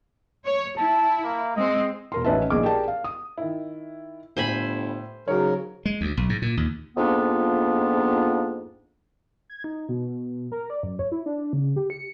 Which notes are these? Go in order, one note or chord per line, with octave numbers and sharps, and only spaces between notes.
C#5
E4 A5
A#3
G#3 C4 D#5
E1 A#4 C6
A1 D#3 C#4 B4 E5 A5
A#1 D#3 G#4 D6
G4 G#4 A#4 D5 G5 A5
F5
D#6
D#3 E4
G1 A2 C5 G#5 B5
G#2 C#3 F#3 F#4 A#4 C#5
G#3
D2
B1
G#2
A#2
D#2
F2 G#2 A#3 B3 D4 F4
G#6
D#4
B2
A#4
D5
F#2
C#5
E4
D4
C#3
G4
C#7